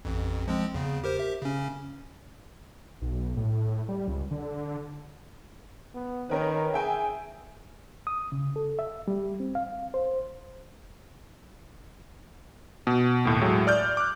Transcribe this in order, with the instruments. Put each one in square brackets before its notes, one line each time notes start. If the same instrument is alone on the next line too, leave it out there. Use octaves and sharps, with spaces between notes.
[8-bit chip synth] A1 F2
F3 G#3 C4
E2 C#3
G4 A#4 C5
G4 E5
C#3 C#4
[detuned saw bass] B1
A2
G3
C#2
D3
[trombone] B3
[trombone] D#3 [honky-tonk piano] C#4 A#4 B4
[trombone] G#4 [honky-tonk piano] E5 G5 G#5
[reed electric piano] D#6
C#3
A4
E5
G3
C4
F5
C5
[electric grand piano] B2
D#2 A2
A2 F#3 G#3
D5 F6 G6
D6 F#6